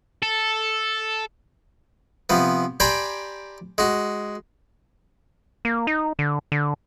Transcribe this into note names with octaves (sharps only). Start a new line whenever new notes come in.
A4
C3 F3 B3
G4 C5 D5 G#5 A#5 B5
G#3 F#4
A#3
D#4
D3
D3